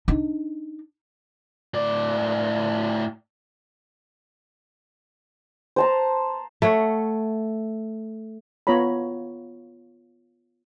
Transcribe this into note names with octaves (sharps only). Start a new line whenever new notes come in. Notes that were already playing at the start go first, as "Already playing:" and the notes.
D4 D#4
A2 D5
C5 A5 A#5
A3 C#5 F#5
B3 F4 C#5 A#5 B5